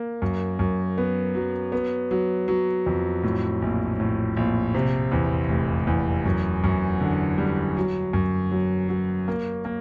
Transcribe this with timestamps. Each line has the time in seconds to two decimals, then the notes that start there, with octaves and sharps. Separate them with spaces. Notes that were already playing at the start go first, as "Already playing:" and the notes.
Already playing: A#3
0.22 F#2
0.59 F#2
0.98 B3
1.35 F#3
1.72 B3
2.11 F#3
2.48 F#3
2.86 F2
3.23 A2
3.62 A#1
4.00 A2
4.37 A#1
4.75 C3
5.12 E2
5.49 F1
5.87 E2
6.25 F#2
6.64 F#2
7.01 D3
7.38 G3
7.77 F#3
8.13 F#2
8.52 F#3
8.89 F#3
9.28 A#3
9.65 A#3